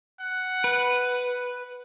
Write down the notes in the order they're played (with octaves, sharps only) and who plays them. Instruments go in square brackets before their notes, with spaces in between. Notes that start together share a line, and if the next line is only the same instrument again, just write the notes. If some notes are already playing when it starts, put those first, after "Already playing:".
[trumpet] F#5
[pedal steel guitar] B4